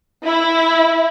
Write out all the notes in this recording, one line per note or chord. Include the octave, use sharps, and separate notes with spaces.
E4